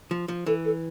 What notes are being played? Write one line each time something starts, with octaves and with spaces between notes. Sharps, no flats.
F3
F3
E3 A4
A4